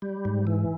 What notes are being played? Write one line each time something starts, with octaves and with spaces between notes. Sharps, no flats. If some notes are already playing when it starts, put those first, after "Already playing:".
G3
G#2
E3